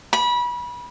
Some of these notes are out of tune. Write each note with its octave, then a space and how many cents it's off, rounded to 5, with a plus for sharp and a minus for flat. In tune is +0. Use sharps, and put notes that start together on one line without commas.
B5 -30